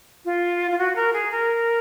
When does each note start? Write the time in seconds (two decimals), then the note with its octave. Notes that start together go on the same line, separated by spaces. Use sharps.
0.25 F4
0.71 F4
0.78 F#4
0.95 A#4
1.13 G#4
1.31 A#4